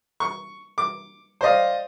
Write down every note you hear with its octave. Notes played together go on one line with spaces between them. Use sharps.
C#6
D6
C5 D5 D#5 F5